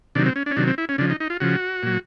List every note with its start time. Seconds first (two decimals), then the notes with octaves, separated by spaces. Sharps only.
0.15 C3 D#3 F#3 D4
0.26 C4
0.36 C#4
0.46 D4
0.51 C#4
0.56 C3 D#3 F#3 D4
0.67 C4
0.78 E4
0.89 C#4
0.98 C#3 F3 D4
1.10 D#4
1.20 D#4
1.30 F4
1.40 C#3 F3 F#4
1.83 A#2 F#3